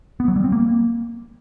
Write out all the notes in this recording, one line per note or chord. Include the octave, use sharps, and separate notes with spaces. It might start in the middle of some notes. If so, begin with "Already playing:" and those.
B3
F#3
G3
C4
A#3